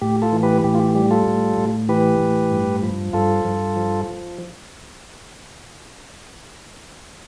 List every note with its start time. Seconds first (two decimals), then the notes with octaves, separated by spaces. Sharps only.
0.01 A2 G4
0.22 F4 A4
0.32 E3
0.43 G4 B4
0.64 A2 G4
0.75 F4
0.80 G4
0.95 G3 G4
1.11 F4 A4
1.27 A2
1.57 A2
1.89 E3 G4 B4
2.20 A2
2.51 G2
2.83 F3
3.13 G2 F4 A4
3.45 G2
3.76 F3